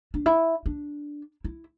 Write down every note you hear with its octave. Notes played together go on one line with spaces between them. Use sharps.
D4
E4
D4
E4